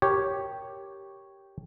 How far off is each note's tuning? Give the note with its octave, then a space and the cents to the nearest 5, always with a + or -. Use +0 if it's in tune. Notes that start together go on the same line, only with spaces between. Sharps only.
G4 +0 A#4 +0 C#5 +0